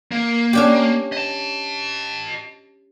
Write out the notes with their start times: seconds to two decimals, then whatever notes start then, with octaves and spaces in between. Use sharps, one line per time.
0.12 A#3
0.53 C#4 D4 G4
1.12 D#5 A5